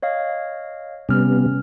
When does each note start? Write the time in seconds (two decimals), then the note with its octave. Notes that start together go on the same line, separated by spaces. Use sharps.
0.03 C#5 D#5 F5
1.09 C3 G3 B3 C#4 F6